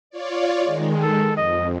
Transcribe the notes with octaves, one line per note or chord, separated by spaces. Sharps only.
F4 C#5 D5
D#3 G#3
A4
F2 D#5